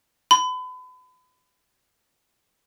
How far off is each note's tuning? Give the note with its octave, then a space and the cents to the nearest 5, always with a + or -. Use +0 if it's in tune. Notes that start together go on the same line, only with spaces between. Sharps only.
B5 +35